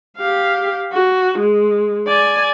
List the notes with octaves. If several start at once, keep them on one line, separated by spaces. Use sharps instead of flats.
G4 F5
F#4
G#3
D5 G#5